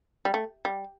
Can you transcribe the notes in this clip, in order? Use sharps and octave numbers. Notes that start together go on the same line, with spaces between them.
G3
A3
G3